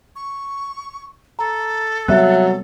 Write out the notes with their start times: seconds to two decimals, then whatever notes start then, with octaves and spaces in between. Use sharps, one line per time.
0.16 C#6
1.39 A4 A#5
2.08 C3 F#3 G3 B3 E5 F#6